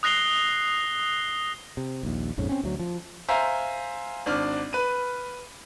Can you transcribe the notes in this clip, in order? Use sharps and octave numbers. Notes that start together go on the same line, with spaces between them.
D#6 F#6 A#6 C7 G7
C3
A#1 D#2
A#1 F2 G#2 C#4
C4 C#4
D2 F#3
F3
C5 E5 F5 G#5 A#5
G#1 D4 F6
B4 D#7